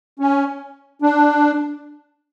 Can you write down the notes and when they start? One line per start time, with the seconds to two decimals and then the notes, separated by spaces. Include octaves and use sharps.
0.19 C#4
1.02 D4